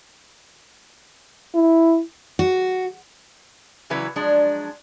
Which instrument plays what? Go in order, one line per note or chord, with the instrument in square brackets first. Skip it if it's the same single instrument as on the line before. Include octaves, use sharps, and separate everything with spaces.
[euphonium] E4
[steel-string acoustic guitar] F#4
[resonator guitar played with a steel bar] C#3 E3 F#3 E4 B4
F3 F#3 G#3 D4